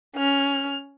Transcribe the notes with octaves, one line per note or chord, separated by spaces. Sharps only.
C#4 F6